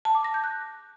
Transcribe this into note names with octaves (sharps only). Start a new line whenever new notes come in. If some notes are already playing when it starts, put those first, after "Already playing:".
A5
D6
A#6
G6
F#6